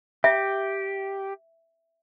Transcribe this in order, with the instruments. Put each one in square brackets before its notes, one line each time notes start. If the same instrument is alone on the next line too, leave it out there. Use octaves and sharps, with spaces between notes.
[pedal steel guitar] G4 [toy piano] E5